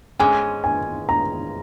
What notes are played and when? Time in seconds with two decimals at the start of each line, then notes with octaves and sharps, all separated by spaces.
0.19 G#2 G#3 C#4 G#5
0.64 G#5
1.09 A#5